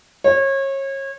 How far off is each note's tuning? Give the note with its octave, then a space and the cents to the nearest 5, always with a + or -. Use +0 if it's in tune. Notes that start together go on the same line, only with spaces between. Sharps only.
C#5 -30